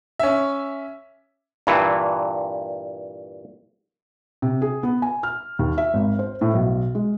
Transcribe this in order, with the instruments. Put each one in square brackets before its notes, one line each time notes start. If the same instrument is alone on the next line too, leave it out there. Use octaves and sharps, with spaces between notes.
[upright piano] C#4 E5
[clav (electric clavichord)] G2 A#2 E3
[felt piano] C3
G#4
B3
G#5
F6
D#2
E5
G#1
C5
A2
B1
G#3